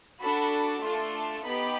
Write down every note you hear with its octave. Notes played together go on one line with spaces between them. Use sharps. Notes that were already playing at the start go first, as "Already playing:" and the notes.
D4 F#4 A4 B5
A3 D4 F4 A4 C6
B3 D#4 G4 B5